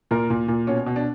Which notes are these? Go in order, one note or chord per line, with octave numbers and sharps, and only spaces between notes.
A#2 A#4
A#2
A#2
B2 C#4
B2
D4